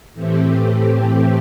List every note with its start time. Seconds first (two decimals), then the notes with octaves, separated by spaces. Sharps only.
0.13 A2 E3 A3 C4 G4